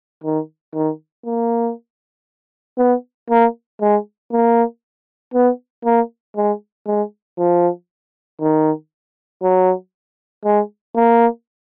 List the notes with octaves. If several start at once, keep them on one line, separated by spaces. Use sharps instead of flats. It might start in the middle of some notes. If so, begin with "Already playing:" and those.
D#3
D#3
A#3
B3
A#3
G#3
A#3
B3
A#3
G#3
G#3
F3
D#3
F#3
G#3
A#3